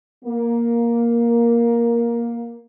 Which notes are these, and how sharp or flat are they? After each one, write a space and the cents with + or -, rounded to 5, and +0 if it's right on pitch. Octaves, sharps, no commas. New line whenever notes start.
A#3 +10